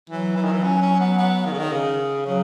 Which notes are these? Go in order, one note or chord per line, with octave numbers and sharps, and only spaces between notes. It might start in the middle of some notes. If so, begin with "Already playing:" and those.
E3 F#3
E3
D#3
E3
C#4
C#4
B3
B3
D#3
C#3
D#3
C#3
C#3 F#3